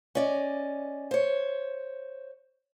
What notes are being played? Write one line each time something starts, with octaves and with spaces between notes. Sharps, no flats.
C#4 D5 D#5
C5 C#5